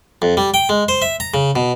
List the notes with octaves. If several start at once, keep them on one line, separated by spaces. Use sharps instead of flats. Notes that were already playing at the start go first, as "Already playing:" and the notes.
F2
G3
G5
G#3
C5
E5
A#5
C#3
B2